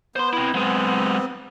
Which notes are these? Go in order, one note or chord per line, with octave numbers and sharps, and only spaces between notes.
B3 C5 C6
C4 E4
F#3 G#3 B3 C4